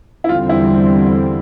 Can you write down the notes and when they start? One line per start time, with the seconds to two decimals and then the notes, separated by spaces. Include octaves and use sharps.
0.24 E4
0.29 E2 D3 G3 C4 F4
0.49 E4